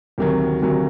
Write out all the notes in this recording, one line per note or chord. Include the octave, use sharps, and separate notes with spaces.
D2 C3 D#3 F#3
D2 C3 D#3 F#3